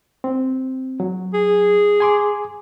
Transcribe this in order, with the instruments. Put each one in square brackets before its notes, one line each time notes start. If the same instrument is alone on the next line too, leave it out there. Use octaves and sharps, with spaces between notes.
[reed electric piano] C4
F#3
[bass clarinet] G#4
[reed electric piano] G#5 C6 D6